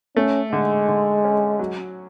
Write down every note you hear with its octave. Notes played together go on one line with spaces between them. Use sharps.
A3 C#4
D3 G#3
D3
C#4
F#3